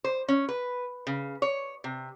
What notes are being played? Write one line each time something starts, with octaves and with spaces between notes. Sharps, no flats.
C5
C#4
B4
C#3
C#5
C3